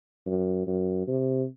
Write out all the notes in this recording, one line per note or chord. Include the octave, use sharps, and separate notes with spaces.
F#2
F#2
C3